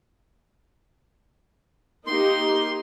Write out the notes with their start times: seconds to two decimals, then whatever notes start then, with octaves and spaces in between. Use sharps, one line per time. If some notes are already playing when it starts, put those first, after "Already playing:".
2.07 A#3 D#4 G4 C6